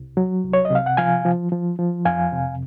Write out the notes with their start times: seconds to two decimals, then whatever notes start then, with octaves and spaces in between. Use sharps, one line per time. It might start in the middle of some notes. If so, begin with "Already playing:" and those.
Already playing: C2
0.17 F#3
0.44 C2
0.53 C#5
0.65 D#5
0.70 C3
0.75 F5
0.86 F#5
0.97 F3 F5 G#5
1.25 F3
1.52 F3
1.79 F3
2.05 F2 F5 G#5
2.32 C3